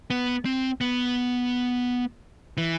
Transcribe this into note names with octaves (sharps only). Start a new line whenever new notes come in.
B3
C4
B3
E3